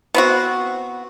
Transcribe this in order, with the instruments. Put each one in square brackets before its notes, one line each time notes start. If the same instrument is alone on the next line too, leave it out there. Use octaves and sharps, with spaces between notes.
[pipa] B3 C4 F#4